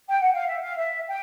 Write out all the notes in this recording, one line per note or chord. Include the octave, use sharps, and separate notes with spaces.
G5
F#5
F5
E5
F5
E5
G5